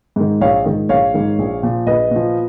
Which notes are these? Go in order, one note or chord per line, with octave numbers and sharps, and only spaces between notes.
G#2 D#3
A#1 C#5 F5
G#2 D#3
A#1 C#5 F5
G#2 D#3
A#1
A#2 F3
A#1 B4 D#5
A#2 F3